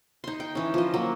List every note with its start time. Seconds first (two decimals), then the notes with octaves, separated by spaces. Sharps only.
0.24 D#4 C6
0.40 G5
0.55 E3 C#4
0.74 F3 D#5
0.94 F#3 A#3